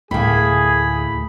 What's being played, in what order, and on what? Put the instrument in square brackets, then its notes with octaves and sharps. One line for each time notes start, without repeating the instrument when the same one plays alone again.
[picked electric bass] D2 A3 [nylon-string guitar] A2 A#3 [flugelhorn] G#4 [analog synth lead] B5